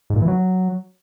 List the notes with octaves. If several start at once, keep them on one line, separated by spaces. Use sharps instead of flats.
G#2
A#2
E3
F#3